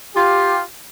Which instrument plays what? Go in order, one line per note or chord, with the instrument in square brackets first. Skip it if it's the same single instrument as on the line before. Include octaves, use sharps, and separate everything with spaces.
[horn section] F4 G4